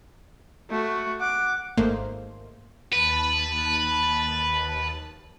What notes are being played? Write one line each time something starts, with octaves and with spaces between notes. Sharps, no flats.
A3 F#4
F#5 D6
G#1 G#2 A3 A#3 C5
D#2 B4 A5